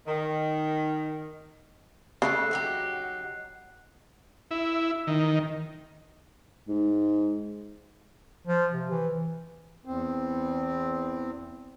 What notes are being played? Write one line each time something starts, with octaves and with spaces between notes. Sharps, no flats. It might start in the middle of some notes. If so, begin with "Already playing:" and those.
D#3
C#3 A3 G4 A4 F#6 C7
F#3 D#4 G4 F#5
E4
D#3
G#2
F3
C3
E3
E2 C4